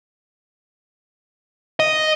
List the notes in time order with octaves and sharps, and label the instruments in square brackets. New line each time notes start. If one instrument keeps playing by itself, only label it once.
[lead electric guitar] D#5